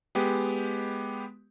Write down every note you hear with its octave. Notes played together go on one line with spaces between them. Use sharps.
G#3 B3 G4